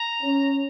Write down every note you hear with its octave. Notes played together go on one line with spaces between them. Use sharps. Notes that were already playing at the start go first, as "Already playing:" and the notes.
Already playing: A#5
C#4